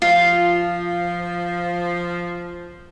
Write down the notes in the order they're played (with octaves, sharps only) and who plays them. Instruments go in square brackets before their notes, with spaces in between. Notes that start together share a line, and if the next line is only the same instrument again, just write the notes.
[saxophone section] F3 [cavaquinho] F4